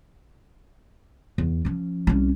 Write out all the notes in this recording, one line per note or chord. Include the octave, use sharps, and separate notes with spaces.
E2
F3 C#4
C2 C#4